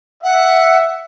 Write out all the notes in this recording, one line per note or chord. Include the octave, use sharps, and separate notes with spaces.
E5 F#5